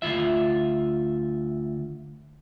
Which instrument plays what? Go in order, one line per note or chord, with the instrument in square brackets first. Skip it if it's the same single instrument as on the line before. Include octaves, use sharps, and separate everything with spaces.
[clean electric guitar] D2 C#3 F4 E5